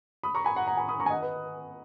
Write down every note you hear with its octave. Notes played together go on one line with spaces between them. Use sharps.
B5 D#6
A#5 C#6
G#5 B5
F#5 A#5
F#5 A#5
G#5 B5
B5 D#6
A#5 C#6
G#5
D#5 F#5
B4 D#5